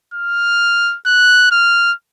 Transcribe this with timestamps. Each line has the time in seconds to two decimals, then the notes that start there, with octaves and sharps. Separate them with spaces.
0.14 F6
1.06 F#6
1.52 F6